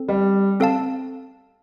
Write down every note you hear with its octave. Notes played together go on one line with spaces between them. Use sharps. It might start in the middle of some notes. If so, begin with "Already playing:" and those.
Already playing: C4 A4
G3
C4 A4 F5 A5